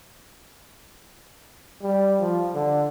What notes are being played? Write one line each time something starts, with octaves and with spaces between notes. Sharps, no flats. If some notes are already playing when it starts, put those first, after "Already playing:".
G3
F3
D3